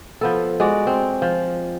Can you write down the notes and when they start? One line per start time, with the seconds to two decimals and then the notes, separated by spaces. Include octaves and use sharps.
0.21 F3 B3 A4
0.60 G#3 F#4 D5
0.87 C4
1.22 F3